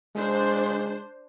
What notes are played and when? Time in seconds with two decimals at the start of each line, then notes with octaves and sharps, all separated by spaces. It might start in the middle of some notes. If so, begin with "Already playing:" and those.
0.15 G#3 D4 C5